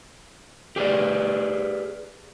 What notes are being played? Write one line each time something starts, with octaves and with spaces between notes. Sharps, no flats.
G4 G#4 B4 D5